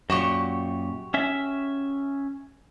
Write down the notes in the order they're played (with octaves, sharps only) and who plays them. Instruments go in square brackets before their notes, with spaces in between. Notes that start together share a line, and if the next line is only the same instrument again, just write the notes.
[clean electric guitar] F#2 A#2 [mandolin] F#4 G4 C#6
[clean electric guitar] C#4 E5